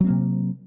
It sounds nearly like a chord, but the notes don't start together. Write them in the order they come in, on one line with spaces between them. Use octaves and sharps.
F#3 C4 A#3 C3